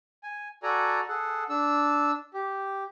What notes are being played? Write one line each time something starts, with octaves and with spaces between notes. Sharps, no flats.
G#5
F#4 A4 D5 G#5 A#5
G#4 A4 F#5
D4 E6
G4